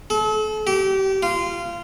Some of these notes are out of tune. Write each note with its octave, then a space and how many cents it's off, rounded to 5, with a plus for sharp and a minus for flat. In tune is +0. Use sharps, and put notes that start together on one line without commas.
A4 -40
G4 -30
F4 -20